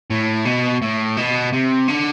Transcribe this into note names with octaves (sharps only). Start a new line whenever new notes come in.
A2
B2
A2
B2
C3
D3